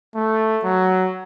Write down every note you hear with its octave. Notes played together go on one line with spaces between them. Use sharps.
A3
F#3